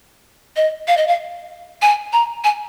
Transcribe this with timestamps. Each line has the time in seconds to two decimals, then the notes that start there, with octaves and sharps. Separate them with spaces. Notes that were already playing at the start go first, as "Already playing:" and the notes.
0.56 D#5
0.88 F5
0.97 D#5
1.08 F5
1.82 G#5
2.13 A#5
2.44 G#5